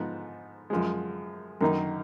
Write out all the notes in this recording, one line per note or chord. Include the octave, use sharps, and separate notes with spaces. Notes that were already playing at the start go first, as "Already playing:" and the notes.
Already playing: G#2 F3 B3 D#4
F#2 F3 G#3
F#2 D#3 A#3 D#4